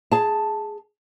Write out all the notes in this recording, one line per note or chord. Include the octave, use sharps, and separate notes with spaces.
G#4 A5